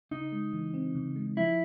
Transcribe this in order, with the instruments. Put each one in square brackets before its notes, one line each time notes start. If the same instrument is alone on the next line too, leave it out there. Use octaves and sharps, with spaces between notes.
[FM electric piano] C#3 [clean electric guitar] D#4
[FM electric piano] G#3
E3
C4
C#3
G#3
[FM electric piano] F3 [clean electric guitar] E4